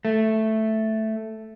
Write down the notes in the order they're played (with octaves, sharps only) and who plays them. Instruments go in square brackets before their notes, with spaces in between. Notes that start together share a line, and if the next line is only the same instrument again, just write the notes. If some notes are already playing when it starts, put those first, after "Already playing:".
[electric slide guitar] A3